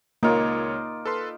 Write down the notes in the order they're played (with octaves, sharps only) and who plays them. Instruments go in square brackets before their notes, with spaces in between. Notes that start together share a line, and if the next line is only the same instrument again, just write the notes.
[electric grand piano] C#2 C#5 [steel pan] A#3 [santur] D#4 F4 D5
[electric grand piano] A4 B4 C6